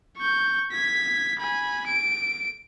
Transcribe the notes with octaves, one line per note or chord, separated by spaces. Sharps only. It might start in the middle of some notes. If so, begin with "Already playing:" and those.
C#6 G6
G#6 B6
G#5 B5
D7